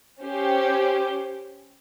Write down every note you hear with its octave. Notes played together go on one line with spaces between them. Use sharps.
C#4 G4 C5